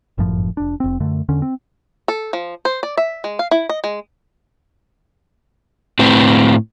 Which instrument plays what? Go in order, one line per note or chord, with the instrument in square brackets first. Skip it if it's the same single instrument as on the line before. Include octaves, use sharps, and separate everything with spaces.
[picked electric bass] G1 F#2 A2 F3
F1 D4
F1 C4
F#2 D3 A3
E2 D3 C#4
C4
[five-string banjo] A4
F3
C5
D5
E5
G#3
F5
E4
D#5
G#3
[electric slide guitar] A2 C4 B4